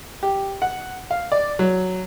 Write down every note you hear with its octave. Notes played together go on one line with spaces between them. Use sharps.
G4
F#5
F5
D5
F#3